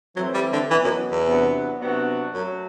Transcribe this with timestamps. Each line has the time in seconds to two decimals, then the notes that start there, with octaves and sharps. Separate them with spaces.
0.16 E3 F#3 A3 C4 E4
0.34 G3
0.53 D3
0.70 B2 E3 F#3 B3
0.84 F#2
1.11 E2
1.26 C3 F#3 B3 D4
1.80 C3 F#3 B3 D4 F#4
2.34 F#2 F#3 A3